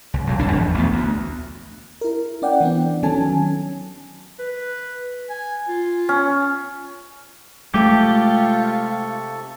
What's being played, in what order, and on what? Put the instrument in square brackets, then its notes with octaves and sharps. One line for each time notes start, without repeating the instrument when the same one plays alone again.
[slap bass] C#2
B1 F#3
G1 C2 G#2 D4
E2 F3
A1 D2 B3
D2
[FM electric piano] E4 A#4
C#4 D5 F#5 G5
E3 B3 C4 D4
D#3 F#3 C#4 A4 G#5 A5
[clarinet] B4
G#5
F4
[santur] C#4
[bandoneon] C3 A4 C#6 [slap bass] G#3 A3 [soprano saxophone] F4 [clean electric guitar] G4